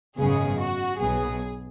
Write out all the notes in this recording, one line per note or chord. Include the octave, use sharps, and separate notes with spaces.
G#1 F#2 C#3 G#3 B3 G#4
F#4
B1 B2 F#3 B3 G#4